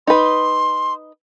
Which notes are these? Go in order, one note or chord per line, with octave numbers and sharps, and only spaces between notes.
D#4 B4 C6